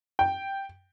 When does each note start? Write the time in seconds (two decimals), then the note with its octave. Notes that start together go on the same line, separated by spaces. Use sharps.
0.19 G5